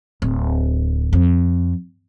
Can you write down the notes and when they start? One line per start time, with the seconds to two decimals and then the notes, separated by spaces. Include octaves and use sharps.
0.22 D1
1.13 F2